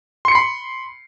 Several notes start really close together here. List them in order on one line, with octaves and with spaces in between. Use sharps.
C6 C#7 C7 B5